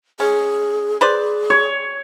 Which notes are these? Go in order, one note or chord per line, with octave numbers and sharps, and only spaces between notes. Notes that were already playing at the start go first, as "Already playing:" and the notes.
C#4 G#4
G#4 B4 C5 D5
C#5